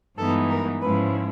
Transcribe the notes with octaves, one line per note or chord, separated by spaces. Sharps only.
G2 E3 G#3 B3 D#4 A4
A#4
G#2 F3 G#3 C#4 E4 B4